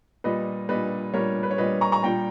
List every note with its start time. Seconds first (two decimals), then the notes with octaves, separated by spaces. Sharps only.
0.24 A#2 G3 B4 D#5
0.69 A#2 G3 B4 D#5
1.14 A#2 G3 A#4 C#5
1.43 B4
1.51 C#5
1.58 A#2 G3 B4 D#5
1.81 A#5 C#6
1.92 A#5 C#6
2.03 A#2 G3 G5 A#5